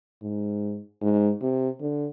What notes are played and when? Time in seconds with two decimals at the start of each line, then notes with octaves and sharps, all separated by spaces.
0.22 G#2
1.02 G#2
1.41 C3
1.80 D3